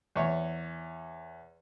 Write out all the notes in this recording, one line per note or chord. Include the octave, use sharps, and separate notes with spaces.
E2 C#5